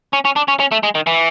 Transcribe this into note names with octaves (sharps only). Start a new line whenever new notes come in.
C#4
C#4
D4
C#4
C#4
A3
G#3
D#3
E3